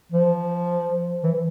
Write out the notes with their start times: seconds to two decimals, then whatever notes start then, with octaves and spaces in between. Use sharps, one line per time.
0.12 F3
1.24 E3
1.34 E3